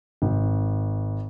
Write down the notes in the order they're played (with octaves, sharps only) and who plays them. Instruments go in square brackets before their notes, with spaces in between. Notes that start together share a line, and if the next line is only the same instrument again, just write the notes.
[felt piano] G#1